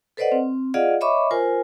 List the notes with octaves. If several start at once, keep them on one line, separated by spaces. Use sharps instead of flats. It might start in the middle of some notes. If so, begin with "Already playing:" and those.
A4 B4 C5 D5 D#5 F#5
C4
F4 G#4 D5 D#5 F5 F#5
C#5 D#5 E5 B5 C#6 D6
F4 A#4 C5 G#5